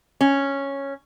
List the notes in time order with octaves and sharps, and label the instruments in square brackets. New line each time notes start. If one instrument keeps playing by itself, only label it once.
[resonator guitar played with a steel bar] C#4